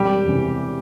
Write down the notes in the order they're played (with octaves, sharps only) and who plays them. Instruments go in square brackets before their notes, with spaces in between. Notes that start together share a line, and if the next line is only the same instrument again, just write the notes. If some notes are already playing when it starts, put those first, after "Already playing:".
Already playing: [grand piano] E1 [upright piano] G3 G4
[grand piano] E2 C3 E3